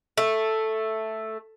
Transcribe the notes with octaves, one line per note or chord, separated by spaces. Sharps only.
A3